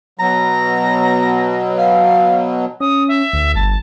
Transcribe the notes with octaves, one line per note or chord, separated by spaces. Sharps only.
B2 F#3 A#5
F5
C#4 D#6
E5
D2
G1 A5